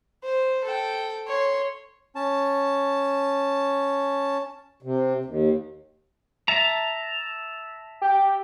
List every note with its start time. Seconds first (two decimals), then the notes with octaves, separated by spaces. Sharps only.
0.23 C5
0.65 A4 G5
1.28 C#5 C6
2.15 C#4 A5
4.82 C3
5.25 D#2
6.48 E5 A5 A#5
8.01 G4